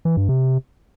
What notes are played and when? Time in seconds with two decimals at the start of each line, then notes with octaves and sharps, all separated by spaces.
0.05 E3
0.17 G2
0.29 C3